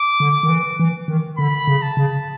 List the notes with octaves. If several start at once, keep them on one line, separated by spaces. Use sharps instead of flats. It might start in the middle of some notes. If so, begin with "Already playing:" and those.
Already playing: D6
D3
D#3
E3
E3
D#3
D3 B5
C#3
A5
C#3